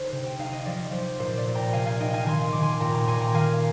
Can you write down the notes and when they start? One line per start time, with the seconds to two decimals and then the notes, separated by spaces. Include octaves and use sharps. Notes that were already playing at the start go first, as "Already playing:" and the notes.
Already playing: D3 D#4 C5
0.12 C3
0.26 G5
0.39 D#4 F5
0.53 D#5
0.65 F3 D5
0.92 F3 C5
1.19 A#2 C5
1.37 D5
1.47 A#2
1.55 G5 A#5
1.73 C3 F5 G#5
1.86 F5 G#5
2.00 D#4 D#5 G5
2.13 F5 G#5
2.25 D#3 G#5 C6
2.53 D#3 D6
2.63 G#5 C6
2.80 A#2 G5 A#5
2.94 A#5 D6
3.07 A#2 G#5 C6
3.21 G5 A#5
3.34 D#3 F5 G#5